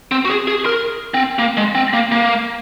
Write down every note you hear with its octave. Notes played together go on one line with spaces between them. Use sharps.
C4
F#4
G#4
G#4
A#4
C4
A#3
G#3
C4
A#3
A#3